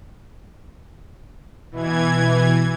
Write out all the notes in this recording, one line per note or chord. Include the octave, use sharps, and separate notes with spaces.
B2 E3 G#6